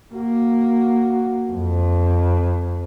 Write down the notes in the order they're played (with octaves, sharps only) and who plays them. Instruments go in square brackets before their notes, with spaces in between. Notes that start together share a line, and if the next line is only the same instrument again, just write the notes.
[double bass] A#3 [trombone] F#4
[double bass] F2